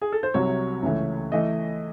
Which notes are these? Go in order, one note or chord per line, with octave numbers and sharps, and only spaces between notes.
G#4
A4
C5
C2 C3 F#3 C#5
C#2 C#3 E3 A3
E3 A3 D#5